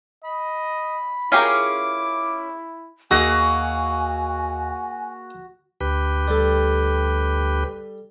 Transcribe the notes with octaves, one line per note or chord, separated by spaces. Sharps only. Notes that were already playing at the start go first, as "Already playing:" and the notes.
D#5 B5
C#4 E4 F4 G4 G#4 A#4 D6
D#2 A#3 F#4 G#4 D#5 G#5 E6
D2 G4 B4
G3 A4